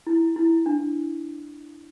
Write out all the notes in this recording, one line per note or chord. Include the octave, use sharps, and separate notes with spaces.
E4
E4
D4